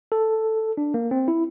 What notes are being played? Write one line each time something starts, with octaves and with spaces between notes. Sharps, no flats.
A4
D4
A#3
C4
E4